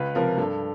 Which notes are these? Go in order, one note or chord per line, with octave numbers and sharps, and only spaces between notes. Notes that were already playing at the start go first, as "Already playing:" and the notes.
Already playing: C#2 B4
C3 F3 A#4
G2 A4